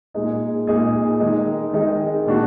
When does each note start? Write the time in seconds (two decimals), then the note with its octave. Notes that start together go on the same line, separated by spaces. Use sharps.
0.14 A#2 G#3 D#4 G#4
0.67 A#2 G#3 D#4 G#4
1.20 D#3 G#3 D#4 G#4
1.73 D#3 G#3 D#4 G#4
2.25 A#2 G#3 D4 F#4